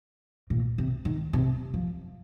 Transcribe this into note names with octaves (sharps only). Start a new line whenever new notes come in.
A#2
C3
D#3
C3
F3